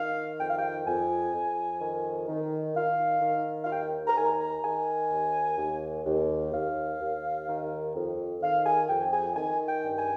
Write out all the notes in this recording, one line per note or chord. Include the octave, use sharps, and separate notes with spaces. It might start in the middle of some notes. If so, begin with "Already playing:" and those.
Already playing: D#3 F5
F2 G5
F5
G5
F2 G#5
F2
D#3
D#3
D#3 F5
D#3
F5
D#2 G5
A#5
D#3 G#5
A#5
D#3 G#5
D#2
D#2
D#2
D#2 F5
D#2
D#3
F2
D#3 F5
G#5
F2 G5
G#5
D#3 G#5
G5
G2
G#5